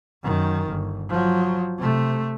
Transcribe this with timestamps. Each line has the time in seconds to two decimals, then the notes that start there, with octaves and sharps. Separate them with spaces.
0.23 F#2 D#3
0.69 G1
1.09 F3 F#3
1.78 C3 A3